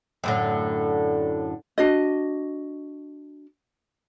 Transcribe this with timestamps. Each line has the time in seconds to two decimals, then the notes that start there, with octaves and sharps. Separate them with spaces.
0.24 F#2 A2 D3
1.78 D4 F#4 D#5